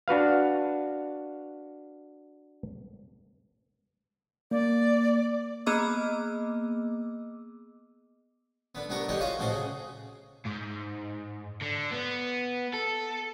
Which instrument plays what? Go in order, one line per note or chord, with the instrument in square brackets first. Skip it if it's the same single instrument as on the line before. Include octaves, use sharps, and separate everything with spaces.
[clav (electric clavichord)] D4 F#4 B4 F5
[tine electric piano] A#3 [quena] D5
[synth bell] A#3 B3 G#4 D#5 D6 E6
[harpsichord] D3 B3
C2 G3 B3 D4 A#4 C#6
D3 E3 D#4 G4 C#5
C#4 F4 F#4 F5 G#5
A1 B2 F#4 A4 C5
C#3 G#4
[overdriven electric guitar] G#2
D3
B3
A4